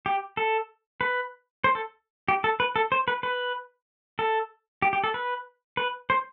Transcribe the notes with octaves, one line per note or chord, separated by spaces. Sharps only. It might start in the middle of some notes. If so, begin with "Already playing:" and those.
G4
A4
B4
C5
A4
G4
A4
B4
A4
C5
B4
B4
A4
G4
G4
A4
B4
B4
C5